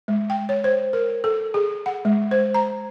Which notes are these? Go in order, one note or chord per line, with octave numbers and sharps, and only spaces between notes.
G#3
G5
C#5
C5
A#4
A4
G#4
F#5
G#3
C5
A#5